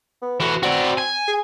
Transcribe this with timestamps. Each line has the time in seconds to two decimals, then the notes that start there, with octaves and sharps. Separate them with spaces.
0.22 B3
0.40 E3 A3 F#4
0.63 C4 F#4 D5
0.98 G#5
1.28 G#4